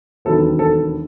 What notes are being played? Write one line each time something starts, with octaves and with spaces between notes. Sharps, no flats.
E1 D#2 D#3 F#3 B3 A4
A4